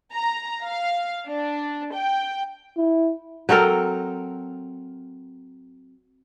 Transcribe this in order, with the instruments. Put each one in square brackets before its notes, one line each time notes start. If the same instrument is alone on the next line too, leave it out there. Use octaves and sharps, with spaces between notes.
[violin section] A#5
F5
D4
G5
[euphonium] E4
[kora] F#3 C4 A4 A#4